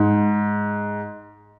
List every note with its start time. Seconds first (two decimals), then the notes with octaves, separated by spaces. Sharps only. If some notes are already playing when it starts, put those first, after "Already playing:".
Already playing: G#2